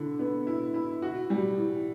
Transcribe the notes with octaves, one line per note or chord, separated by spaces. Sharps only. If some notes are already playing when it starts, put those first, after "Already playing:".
Already playing: D3 E4
B3
E4
E4
F#4
G3
E3